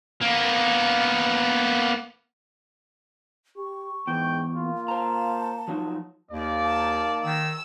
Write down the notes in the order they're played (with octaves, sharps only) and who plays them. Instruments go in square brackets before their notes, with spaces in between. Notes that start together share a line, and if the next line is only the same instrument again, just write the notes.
[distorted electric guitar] A#3 B3
[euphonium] G4 [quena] C#6
[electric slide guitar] E2 [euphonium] G#2 [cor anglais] G5
[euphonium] A#3 [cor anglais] F4
[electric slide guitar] C5 A#5 [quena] A5
[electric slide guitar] F3 F#3 D#4
[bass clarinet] D#2 [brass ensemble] A#3 D#4 D5
[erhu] A5
[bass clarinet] D#3 [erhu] E6